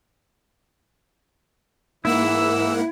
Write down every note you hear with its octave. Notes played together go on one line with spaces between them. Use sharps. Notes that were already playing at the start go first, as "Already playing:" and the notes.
G#2 E3 A#3 E4 F#5 E6